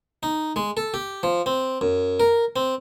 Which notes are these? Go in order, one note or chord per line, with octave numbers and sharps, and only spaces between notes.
D#4
G#3
A4
G4
F3
C4
F#2
A#4
C4